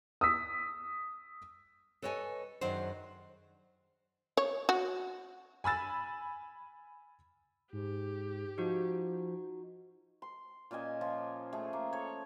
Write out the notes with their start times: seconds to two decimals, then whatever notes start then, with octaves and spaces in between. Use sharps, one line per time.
0.21 D#6 E6 B6
2.02 A4 B4 C#5 D#5 G5 G#5
2.61 F#2 D#3 F#3 D4 G#4 C5
4.37 C#5
4.69 F#4
5.64 G#5 B5 E6 A6
7.73 G#2 G4
8.58 F3 D#4 F#4
10.22 C6
10.71 A#2 C#4 D#5 G#5
11.01 F3 F4
11.53 A3 G#4
11.73 A#3
11.92 A4 C#5